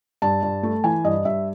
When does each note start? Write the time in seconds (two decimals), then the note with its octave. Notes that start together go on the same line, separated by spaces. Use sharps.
0.22 G2 A5
0.43 G2
0.63 A3
0.84 E3 G#5
1.04 G2 D#5
1.25 G2 E5